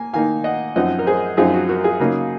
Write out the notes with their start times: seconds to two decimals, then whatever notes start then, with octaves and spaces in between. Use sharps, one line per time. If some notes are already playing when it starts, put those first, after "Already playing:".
Already playing: A#3 G#5
0.13 D#3 A#3 D#4 F5 G#5
0.44 D#5 F#5
0.76 F#2 F3 C4 D#4 D#5 F#5
0.99 A#4
1.06 G#4 C5
1.37 F#2 F3 C4 D#4 F4 G#4
1.54 F#4
1.69 F#4 A#4
1.84 F4 G#4
2.00 C#3 F#3 A#3 D#4